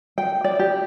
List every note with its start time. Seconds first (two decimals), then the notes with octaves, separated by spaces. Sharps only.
0.18 G5
0.44 D5
0.59 G4